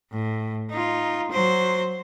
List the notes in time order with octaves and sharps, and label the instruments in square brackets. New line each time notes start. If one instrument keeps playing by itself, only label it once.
[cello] A2
D#4 F4
F#3 C5